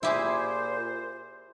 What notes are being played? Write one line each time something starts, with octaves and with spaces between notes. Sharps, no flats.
A#2 E4 G4 G#4 C5